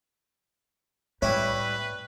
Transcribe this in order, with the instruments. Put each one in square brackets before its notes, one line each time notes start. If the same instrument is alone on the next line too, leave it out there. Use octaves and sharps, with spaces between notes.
[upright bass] A2 [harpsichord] G3 E4 [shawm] B4 [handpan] C#5